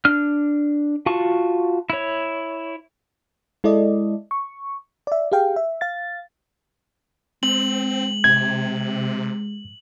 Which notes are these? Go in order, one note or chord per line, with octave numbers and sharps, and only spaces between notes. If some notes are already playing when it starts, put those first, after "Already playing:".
D4 F6
F4 F#4 A5 C#6
E4 C#5
G#3 E4 A4 D5 D#5
C#6
D5 E5
G4 G#4 F5 G5
E5
F5 A6
G#3 C4 F#7
C3 G#6